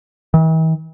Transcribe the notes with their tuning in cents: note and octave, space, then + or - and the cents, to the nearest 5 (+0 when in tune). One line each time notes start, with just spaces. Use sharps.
E3 -45